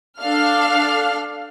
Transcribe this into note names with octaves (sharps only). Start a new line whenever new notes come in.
D4 A4 F5 F6